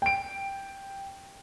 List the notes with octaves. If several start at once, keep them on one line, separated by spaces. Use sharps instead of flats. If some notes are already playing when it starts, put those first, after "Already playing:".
G5 D7